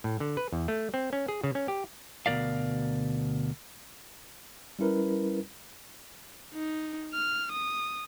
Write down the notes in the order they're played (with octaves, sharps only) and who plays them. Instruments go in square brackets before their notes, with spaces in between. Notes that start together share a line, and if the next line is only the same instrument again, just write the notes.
[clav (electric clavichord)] A2
D3
B4
E2
A3
C4
C#4
G#4
C#3
C#4
G4
[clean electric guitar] D2 B2 G3 A#4 D5 F5
[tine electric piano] G3 C#4 E4 A#4 B4
[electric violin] D#4
F6
D#6